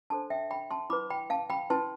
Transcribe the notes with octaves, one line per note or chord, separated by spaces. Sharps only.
D4 A4 C5 A5 C6
E5 G5
G5 B5
A5 C6
E4 B4 B5 D6
G5 B5
F5 A5
G5 B5
E4 B4 A5 C6